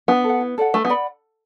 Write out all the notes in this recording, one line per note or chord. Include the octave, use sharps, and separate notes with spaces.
B3 D4
A4
F#5
E4
A4 D5 F#5
A3 B4
B3
D5 F#5 B5